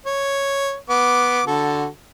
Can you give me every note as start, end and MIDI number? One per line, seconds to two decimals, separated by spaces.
0.06 0.76 73
0.90 1.42 59
0.90 1.42 86
1.47 1.87 50
1.47 1.87 66
1.47 1.87 69